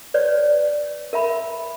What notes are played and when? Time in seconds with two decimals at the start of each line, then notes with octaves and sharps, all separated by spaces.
0.14 B4 C#5 D5
1.13 A#4 E5 B5